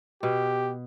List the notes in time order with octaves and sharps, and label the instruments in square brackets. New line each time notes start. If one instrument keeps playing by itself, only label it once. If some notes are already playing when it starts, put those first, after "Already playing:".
[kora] B2 [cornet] G4